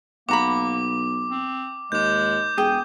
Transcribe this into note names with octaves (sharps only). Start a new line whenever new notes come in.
B1 A#3 F#5 A#5 B5 D6
C4
D#2 G#3 D6 G6
E1 G#4 G5 D#6